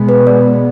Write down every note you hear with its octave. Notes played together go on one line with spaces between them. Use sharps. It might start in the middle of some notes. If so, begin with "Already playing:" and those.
Already playing: B2 G#3 B3
B4
D5